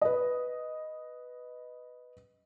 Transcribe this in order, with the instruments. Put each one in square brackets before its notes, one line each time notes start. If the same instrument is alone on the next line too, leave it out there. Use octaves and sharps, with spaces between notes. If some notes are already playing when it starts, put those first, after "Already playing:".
[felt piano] B4 D#5